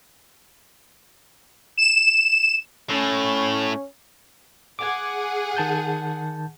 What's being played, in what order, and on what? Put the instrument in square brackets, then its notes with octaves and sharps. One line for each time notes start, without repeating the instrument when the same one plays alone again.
[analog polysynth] E7
[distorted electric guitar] A2 [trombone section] C#4
[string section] G#4 F#5 [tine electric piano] D6 G#6
[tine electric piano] D#3 A5 G6